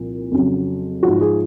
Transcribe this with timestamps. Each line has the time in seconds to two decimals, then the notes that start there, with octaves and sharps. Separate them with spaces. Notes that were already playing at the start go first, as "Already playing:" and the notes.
Already playing: C2 A#2 F3
0.32 F2 C#3 F#3
1.03 G#2 F3 F#4
1.21 G#4